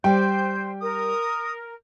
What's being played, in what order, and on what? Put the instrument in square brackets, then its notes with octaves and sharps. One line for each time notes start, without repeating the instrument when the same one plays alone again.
[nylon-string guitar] G3 D5 [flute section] C5 [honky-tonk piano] G5 [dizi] G6
[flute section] A#4 [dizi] D#6